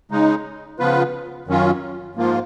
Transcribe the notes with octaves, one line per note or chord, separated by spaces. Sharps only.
C#3 G#3 D#4
C#3 F3 B3 F4 B4
F#2 D#3 F#3 C#4 F4
G#2 F3 A#3 F4